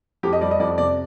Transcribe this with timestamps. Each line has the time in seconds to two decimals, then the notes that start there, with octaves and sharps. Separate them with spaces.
0.23 F2 G4
0.33 D#5
0.41 G3 D5
0.51 D#5
0.60 F2 D5
0.78 C3 D5